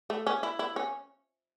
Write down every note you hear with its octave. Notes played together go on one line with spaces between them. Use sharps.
A3
C#4
E4
E4
C#4